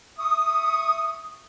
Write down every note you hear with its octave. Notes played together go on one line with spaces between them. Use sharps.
E5 C#6 D#6